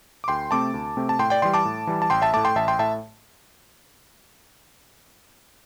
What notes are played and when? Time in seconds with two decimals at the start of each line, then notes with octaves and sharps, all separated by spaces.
0.24 D6
0.28 D2 G5 C6
0.51 C3 A3 C4 A5 D6
0.74 D2
0.97 C3 A3 C4
1.09 A5
1.19 A2 G5 C6
1.30 D5 G5
1.42 E3 G3 G5 C6
1.54 A5 D6
1.65 A2
1.87 E3 G3
2.02 A5
2.10 A1 G5 C6
2.22 E5 A5
2.34 A2 A3 A5 D6
2.45 G5 C6
2.55 A1 E5 A5
2.68 G5 C6
2.79 A2 E5 A5